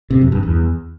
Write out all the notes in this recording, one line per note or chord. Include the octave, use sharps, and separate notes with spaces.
C3
F#2
G2
E2